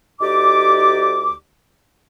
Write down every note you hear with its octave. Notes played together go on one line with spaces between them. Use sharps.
D2 D#4 G4 D5 D6